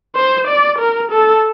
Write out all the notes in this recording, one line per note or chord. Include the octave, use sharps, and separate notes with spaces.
C5
D5
A#4
A4